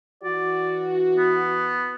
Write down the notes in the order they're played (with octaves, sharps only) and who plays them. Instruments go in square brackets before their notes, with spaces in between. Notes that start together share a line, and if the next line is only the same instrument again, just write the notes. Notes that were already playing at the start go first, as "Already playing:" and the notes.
[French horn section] E3 F#4 [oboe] D5
[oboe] B3